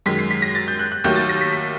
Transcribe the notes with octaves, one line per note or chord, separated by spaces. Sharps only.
F#2 D#3 G#3 B6
C7
B6
A#6
A6
G6
F#6
F#6
D#2 D#3 F#3 A3 G6
A6
A#6
B6
B6